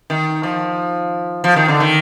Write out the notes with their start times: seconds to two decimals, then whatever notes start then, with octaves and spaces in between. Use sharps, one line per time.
0.10 D#3
0.43 F3
1.44 F3
1.56 D#3
1.68 D3
1.80 D#3